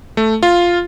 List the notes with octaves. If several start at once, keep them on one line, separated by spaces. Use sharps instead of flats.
A3
F4